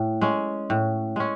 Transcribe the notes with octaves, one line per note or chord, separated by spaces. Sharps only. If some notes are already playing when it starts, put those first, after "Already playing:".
Already playing: A2
G#3 C#4
A2
G#3 C#4